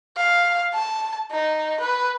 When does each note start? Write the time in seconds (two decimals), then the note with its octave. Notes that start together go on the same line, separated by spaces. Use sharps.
0.17 F5
0.74 A5
1.31 D#4
1.80 B4